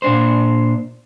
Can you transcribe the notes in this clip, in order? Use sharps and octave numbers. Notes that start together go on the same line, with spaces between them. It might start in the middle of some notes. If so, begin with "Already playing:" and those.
A#2 D4 C5